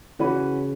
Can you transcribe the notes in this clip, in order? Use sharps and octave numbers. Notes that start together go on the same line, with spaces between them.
C#3 E3 C#4 F#4 B4